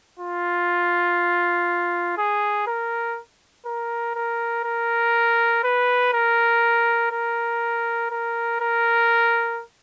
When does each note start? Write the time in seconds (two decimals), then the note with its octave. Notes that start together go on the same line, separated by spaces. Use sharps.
0.19 F4
2.18 G#4
2.67 A#4
3.66 A#4
4.15 A#4
4.65 A#4
5.64 B4
6.13 A#4
7.12 A#4
8.11 A#4
8.61 A#4